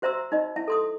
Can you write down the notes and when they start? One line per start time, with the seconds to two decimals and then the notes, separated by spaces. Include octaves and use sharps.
0.02 F#4 C5 E5 A#5 C6 E6
0.32 D#4 D#5
0.56 E4 E5
0.68 A4 C6 D#6